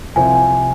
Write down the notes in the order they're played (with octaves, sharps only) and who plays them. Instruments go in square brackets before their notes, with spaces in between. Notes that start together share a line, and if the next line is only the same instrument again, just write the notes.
[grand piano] C2 C3 F3 C4 [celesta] G#5